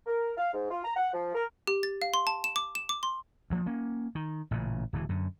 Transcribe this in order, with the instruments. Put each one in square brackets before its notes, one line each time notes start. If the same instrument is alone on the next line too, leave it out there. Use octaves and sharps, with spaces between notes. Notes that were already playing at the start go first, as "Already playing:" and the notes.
[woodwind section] A#4
F5
G#2
F4
A#5
F#5
F3
A#4
[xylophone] G4
A6
F5
C6
A5
E7
D6
E7
D6
C6
[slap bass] D2 F3 A#3
A#3 C#4
D#3
A1 A#2 C#3
D1 A2 E3
F#2 D3